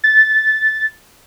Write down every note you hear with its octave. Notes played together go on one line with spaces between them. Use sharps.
A6